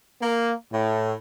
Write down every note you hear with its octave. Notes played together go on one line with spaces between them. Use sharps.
A#3
A2